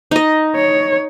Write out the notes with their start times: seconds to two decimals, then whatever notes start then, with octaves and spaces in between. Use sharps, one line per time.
0.11 D#4 D#5
0.56 C#5